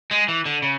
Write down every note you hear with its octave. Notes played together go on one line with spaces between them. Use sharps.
G#3
E3
D3
C#3